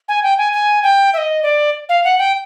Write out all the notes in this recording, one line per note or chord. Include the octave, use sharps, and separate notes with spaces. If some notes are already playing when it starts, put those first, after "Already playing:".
G#5
G5
G#5
G#5
G5
E5
D#5
D5
F5
F#5
G5